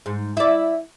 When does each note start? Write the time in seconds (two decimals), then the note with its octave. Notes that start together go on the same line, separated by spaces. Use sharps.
0.06 G#2
0.37 E4 D5